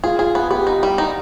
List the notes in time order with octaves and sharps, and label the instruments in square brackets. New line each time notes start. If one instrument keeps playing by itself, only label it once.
[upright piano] F4 [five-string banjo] G#4
[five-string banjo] G#4
B3
[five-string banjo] B3 [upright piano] G4
[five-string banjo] D#4
G3
D#4